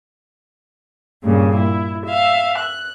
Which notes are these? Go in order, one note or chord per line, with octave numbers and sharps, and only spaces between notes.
G2 A#2 C#3
E4
E5 F5
F#6